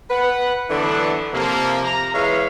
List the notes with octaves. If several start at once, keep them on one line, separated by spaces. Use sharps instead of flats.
B4 F#5
D3 E3 F#3 A3 B3 D4
C3 F3 A#3
A#5
E3 G#3 C#5 E5 F5